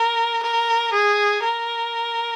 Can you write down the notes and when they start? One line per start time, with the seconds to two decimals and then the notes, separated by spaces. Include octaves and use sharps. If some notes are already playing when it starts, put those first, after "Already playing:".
Already playing: A#4
0.43 A#4
0.93 G#4
1.43 A#4